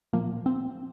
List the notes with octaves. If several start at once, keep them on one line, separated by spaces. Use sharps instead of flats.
A#2 F3 A#3
C4